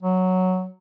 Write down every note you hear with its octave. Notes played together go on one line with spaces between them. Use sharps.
F#3